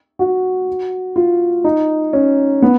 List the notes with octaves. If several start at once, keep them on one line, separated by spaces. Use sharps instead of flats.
F#4
F4
D#4
C#4
B3